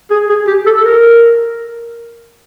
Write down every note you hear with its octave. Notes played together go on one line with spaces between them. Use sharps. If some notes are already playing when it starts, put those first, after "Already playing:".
G#4
G#4
G4
A4
A#4